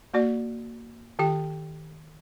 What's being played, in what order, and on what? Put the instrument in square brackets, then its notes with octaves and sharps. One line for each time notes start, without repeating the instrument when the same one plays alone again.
[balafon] A#3 F#4 D5
D#3 G4 G5